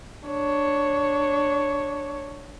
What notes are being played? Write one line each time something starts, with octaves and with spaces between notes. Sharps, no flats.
D4 C#5